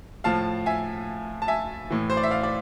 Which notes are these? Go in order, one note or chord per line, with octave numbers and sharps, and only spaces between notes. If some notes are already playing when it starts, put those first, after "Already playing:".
A2 F3 F5 A5
E5 G#5
A5
E5 G#5
A2 E3
C5
D5
E5
D5 F5
D5